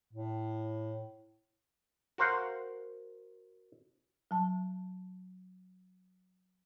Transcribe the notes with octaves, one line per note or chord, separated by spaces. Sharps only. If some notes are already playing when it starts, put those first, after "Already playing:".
A2
F#4 A#4 C5 F5 F#5
F#3 A5